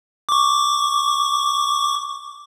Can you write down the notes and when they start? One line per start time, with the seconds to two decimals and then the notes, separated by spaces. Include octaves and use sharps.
0.29 C#6 D6